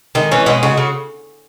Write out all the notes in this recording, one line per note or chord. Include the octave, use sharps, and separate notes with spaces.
D#3 G#3
E3 C#4
B2 G#3
C#3 F#4
C#3